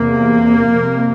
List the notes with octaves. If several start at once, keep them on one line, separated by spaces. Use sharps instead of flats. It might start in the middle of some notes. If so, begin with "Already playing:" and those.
Already playing: E2 C3 A#3
F2 C3